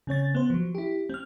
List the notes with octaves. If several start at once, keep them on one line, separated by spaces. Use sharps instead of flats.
C#3 C4 C#5 A6
B3 C5
F3 F#3
E4 G4
C4 F6